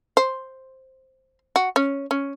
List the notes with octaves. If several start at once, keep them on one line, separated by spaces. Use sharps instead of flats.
C5
F#4
C#4
C#4